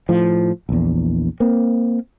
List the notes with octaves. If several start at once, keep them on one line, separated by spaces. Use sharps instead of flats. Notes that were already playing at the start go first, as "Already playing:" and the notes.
A2 F3
A#1 E2
A#3 C4